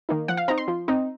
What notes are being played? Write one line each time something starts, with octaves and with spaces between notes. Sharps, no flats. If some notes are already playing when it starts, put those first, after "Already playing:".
D#3 A#3 D#4
F3 F#5
F5
C4 D#4 A#5
C6
F3
C4 D#4